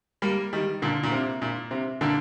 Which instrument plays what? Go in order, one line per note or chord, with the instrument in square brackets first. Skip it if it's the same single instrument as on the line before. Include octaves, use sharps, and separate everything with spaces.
[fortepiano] G3 A#3
D#3 G3
A#2 D3
A#2
C3
A#2
C3
A#2 D3